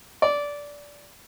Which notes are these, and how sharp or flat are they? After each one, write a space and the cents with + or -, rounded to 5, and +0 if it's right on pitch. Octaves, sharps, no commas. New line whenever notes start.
D5 -15